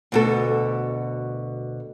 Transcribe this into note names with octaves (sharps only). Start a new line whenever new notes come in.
D2 B2 A4